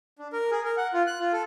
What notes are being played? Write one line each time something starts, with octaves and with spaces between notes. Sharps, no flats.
D4
A#4
G#4
A#4
F#5
F4
F#6
F4
A4